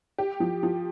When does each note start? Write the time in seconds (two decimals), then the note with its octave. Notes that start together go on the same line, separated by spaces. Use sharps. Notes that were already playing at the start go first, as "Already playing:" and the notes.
0.18 G4
0.40 F3
0.63 F3